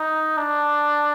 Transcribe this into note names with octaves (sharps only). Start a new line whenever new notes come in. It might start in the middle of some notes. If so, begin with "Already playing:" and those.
Already playing: D#4
D4